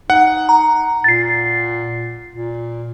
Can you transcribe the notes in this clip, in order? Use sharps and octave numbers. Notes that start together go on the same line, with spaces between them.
D#4 F#5
A#5
A#2 A6 C7
A#2